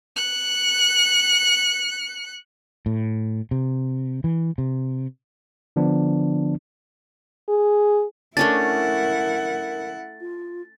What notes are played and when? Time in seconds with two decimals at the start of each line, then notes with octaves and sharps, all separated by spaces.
0.17 F#6 C#7
2.86 A2
3.51 C3
4.24 E3
4.58 C3
5.76 D3 F3 B3 D4
7.49 G#4
8.37 A3 C#4 D4 E4 A#4 F#5 A6
10.21 F4